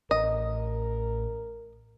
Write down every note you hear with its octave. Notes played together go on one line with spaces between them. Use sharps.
A1 A#4 D#5